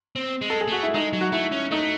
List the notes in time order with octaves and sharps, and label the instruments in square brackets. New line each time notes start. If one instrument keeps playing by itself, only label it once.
[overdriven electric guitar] C4
G#3
[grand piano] A4
G#4
[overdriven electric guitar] A3 [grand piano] F#4
[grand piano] E4
[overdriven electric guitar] G#3 [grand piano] D#4
[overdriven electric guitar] F#3
[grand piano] F#4
[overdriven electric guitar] A3 [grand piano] E4
[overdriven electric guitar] C#4
[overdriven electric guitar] A3 [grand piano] D#4